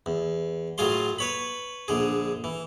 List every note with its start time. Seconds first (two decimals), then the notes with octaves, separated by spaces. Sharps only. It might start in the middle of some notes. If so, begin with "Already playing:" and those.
0.06 E2
0.78 A2 F#3 F4 G#4 F5 C6
1.19 B4 C#5 B5
1.88 A#1 D3 G#4
2.44 E3